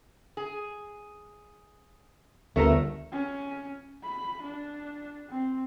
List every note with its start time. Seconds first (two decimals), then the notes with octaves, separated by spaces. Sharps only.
0.37 G#4
2.56 G1 D2 A3 A4 A#4
3.12 C#4
4.04 B5
4.42 D4
5.29 C4